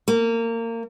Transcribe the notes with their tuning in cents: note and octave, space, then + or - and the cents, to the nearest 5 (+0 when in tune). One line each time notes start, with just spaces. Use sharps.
A#3 -25